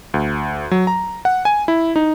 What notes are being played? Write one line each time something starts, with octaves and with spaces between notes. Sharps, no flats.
D2
F#3
A#5
F#5
G#5
E4
D#4